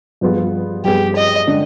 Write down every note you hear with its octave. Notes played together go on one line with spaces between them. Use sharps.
G2 F3 B3 F4 G#4
G2 F3 B3 F4 G4 G#4
D#5
D3 G#3 D4